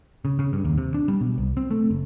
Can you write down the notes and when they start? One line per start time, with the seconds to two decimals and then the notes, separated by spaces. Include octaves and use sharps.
0.25 C#3
0.39 C#3
0.53 G2
0.65 D#2
0.78 C3
0.94 D4
1.08 G3
1.21 B2
1.38 C2
1.57 C4
1.71 A3
1.90 F#1